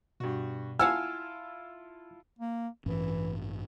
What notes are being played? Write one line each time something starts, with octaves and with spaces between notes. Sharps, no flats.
G2 B2 F#4
E4 F4 F5 F#5 G#5 A5 E6 F6
A#3
A1 G2 E3 C#4